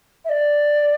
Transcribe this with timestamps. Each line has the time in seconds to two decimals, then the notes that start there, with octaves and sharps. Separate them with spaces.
0.24 E5
0.29 D5